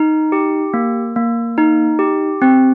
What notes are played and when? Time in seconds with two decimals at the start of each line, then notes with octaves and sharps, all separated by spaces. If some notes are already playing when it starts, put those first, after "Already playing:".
Already playing: D#4
0.32 G4
0.74 A#3
1.16 A#3
1.58 D#4
1.99 G4
2.42 C4